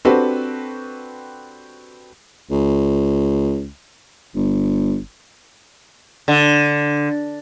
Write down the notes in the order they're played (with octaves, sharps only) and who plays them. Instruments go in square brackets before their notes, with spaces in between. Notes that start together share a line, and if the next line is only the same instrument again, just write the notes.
[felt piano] C4 D4 F#4 G4 A4 B4
[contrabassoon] C#2
G1
[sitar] D3